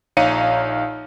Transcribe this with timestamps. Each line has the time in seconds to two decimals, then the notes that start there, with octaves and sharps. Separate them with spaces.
0.17 A#1 D#4 C#5 F5 C#7 D#7